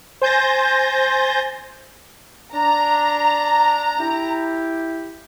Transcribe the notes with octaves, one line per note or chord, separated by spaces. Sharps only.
C5 G#5 G6 A6 A#6
D4 A#5
E4 G4